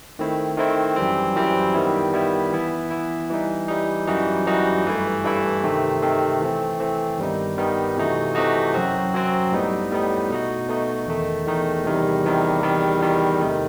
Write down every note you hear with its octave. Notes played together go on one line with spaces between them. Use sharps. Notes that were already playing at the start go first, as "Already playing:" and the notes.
D#3 A3 C4 E4
D#3 A3 C4 E4
F#2 E3 G3 C4
F#2 E3 G3 C4
D#3 G3 B3 E4
D#3 G3 B3 E4
E3 B3 E4
E3 B3 E4
E3 G3 D#4
E3 G3 D#4
F#2 E3 G3 D#4 F#4
F#2 E3 G3 D#4 F#4
G2 E3 A3 E4
G2 E3 A3 E4
C3 D#3 A3 C4
C3 D#3 A3 C4
E3 A3 C4
E3 A3 C4
G2 D#3 G3 B3 D#4
G2 D#3 G3 B3 D#4
C3 E3 A3 D#4 F#4
C3 E3 A3 D#4 F#4
F#2 F#3 C4 F#4
F#2 F#3 C4 F#4
A2 G3 B3 D#4
A2 G3 B3 D#4
B2 A3 D#4 F#4
B2 A3 D#4 F#4
E2 D#3 A3 D#4
E2 D#3 A3 D#4
E2 C3 D#3 G3
E2 C3 D#3 G3
E2 D#3 G3
E2 D#3 G3
C3 D#3 A3 D#4